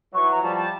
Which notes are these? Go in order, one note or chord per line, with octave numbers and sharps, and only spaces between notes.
E3 F#3 C#6
A#5
F3 G3 A5
A5